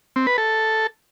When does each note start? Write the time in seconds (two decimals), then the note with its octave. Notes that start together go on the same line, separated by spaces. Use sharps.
0.16 C4
0.27 B4
0.38 A4